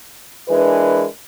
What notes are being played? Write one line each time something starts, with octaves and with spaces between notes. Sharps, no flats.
E3 G#3 D4 A#4 B4